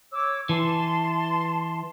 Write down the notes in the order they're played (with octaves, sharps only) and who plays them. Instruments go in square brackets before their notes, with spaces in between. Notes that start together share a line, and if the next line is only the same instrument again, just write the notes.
[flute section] C#5 D6 E6
[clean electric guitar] E3 [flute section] A5 C6